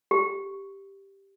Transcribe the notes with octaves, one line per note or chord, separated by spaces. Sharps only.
G4